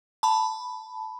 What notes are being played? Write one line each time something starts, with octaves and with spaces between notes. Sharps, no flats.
A5 B5